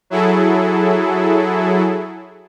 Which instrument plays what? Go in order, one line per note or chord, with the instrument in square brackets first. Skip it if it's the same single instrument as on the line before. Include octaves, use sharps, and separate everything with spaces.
[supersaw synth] F#3 E4 G#4 A4